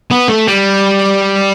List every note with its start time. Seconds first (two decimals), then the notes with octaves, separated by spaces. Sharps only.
0.11 B3
0.28 A3
0.47 G3